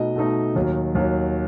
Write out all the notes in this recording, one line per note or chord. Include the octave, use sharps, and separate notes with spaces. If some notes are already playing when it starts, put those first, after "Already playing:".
Already playing: B2 A3 D#4 D#5
B2 A3 D#4
D#2 D#3 F#3
D#2 D#3 F#3